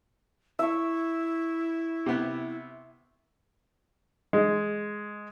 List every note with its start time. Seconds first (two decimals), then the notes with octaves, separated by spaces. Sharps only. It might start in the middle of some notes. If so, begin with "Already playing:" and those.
0.59 E4 E5 C#6
2.06 C3 B3
4.33 G#3